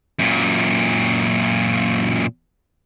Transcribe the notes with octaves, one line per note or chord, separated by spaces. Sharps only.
F#2 A#2